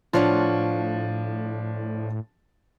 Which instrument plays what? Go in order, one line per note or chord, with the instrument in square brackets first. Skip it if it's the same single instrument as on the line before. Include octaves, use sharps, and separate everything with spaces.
[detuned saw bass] A2 [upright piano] F3 D4 [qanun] F4 C#5 F#5